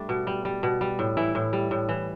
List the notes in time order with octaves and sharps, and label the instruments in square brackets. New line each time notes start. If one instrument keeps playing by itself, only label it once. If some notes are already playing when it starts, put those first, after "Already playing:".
Already playing: [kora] G3 A3 D4
B2
G3
G3
B2
G3
A2
E3 E4
A2
G3
A2
E3